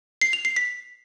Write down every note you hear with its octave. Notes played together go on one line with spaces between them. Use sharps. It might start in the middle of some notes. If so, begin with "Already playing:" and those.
C7
F7
C7
B6